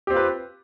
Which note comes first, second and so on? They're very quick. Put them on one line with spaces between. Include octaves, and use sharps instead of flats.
G4 C4 F4 B4